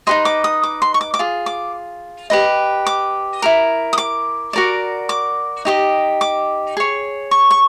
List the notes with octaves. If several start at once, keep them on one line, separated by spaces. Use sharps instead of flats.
D#4 G4 B4 D#5 C6
D6
D#6
D6
C6
C#6
D6
D6
F4 G#4
D6
G4 B4 D#5
D6
E4 G4 A#4
D#6
D6
F#4 A#4 D5
D6
D#4 G4 C5 D#5
D6
G#4 C#5
C#6
C#6